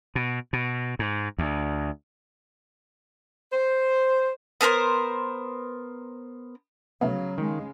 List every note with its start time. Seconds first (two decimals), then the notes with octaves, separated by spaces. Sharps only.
0.15 B2
0.53 B2
0.99 G#2
1.38 D2
3.52 C5
4.61 B3 A4 A#4 C5
7.01 C2 C#3 F#3 A3 B3 F5
7.38 D#3 G#3